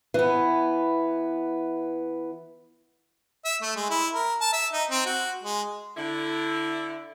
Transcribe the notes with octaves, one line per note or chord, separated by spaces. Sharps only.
E3 B3
E5
A3
G#3
E4
A#4
A5
E5
D#4
C4
F#4
G#3
D3 E4